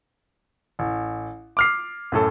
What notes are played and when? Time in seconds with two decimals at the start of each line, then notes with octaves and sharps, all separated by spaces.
0.79 A1
1.57 D6 F6 C7
2.12 F#2 A2 A4